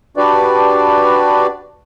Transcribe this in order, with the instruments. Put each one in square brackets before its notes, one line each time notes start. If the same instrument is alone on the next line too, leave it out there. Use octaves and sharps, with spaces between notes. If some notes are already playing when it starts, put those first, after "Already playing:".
[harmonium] D4 F#4 G4 B4 D5